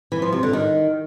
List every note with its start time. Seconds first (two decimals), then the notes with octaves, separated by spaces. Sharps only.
0.12 E3
0.22 F3
0.32 C3
0.43 D3
0.53 D#3